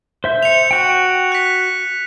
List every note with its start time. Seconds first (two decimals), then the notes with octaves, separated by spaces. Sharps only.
0.24 C5 E5 G6
0.43 C#7 F7
0.71 F#4 G5
1.32 F#6 B6